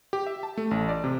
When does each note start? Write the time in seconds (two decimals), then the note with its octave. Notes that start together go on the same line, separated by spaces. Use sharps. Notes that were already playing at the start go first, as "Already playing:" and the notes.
0.13 G4
0.26 E5
0.43 A5
0.57 A3
0.71 A1
0.89 D5
1.04 C3